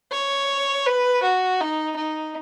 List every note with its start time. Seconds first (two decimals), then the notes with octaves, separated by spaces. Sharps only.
0.12 C#5
0.86 B4
1.22 F#4
1.61 D#4
1.96 D#4